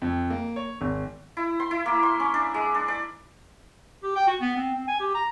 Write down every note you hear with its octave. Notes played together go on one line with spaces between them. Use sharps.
F2
A#3
C#5
G#1
E4
C6
E4
A#3
C6
C#4
D4
G#3
D4
D5
G4
G5
F#4
B3
C4
C4
G#5
G4
A#5